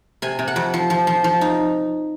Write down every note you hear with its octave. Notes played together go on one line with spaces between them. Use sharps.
C3 G#5
C3
F#5
F2
F3
F3
F3
F3
D#4